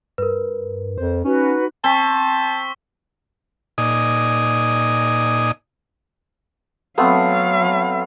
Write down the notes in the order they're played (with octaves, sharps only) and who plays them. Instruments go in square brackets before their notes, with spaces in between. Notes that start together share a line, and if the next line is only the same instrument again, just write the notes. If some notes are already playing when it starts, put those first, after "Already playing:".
[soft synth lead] G2 [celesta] A#4 B4
[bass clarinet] F2 [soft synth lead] C5
[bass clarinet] C#4 [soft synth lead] D#4 [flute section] F#4 B4
[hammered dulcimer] C4 [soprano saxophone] A5 [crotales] C#6 B6 G7
[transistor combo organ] A#2 D#4 D5 D#5 G#5 D#6
[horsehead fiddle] F#3 F5 [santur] A3 B3 C4